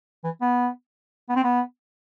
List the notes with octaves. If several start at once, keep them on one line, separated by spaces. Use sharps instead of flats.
E3
B3
B3
C4
B3